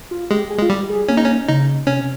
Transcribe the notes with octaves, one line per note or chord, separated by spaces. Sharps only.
F4
G#3 G4
G#4
G#3 F4
G3 G4
G#4
A#3 C#4
D#4
C#4
C#3 D#4
C3 C#4